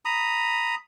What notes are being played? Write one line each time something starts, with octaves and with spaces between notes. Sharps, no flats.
A#5 B5 D#6